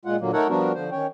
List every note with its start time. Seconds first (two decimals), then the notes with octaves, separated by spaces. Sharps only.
0.05 A#2 G#3 F4 F#5
0.20 A#2 D3 F#3 A#3
0.33 A3 D#4 A4 A#4 C#5 F#5
0.49 F3 G3 B3 D4 F#4 A#4
0.75 D3 F3 C5
0.92 D#3 C#4 C#5 G5